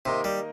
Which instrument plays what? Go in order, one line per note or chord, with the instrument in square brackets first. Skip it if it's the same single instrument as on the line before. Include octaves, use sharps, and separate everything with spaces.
[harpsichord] C3 [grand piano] D#3 A#3 D#4 A#4 D#5
[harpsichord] G3